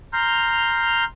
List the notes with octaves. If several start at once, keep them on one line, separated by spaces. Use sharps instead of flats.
A#5 C6 F6 G6